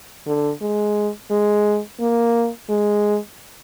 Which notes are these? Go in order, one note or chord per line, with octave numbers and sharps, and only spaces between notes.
D3
G#3
G#3
A#3
G#3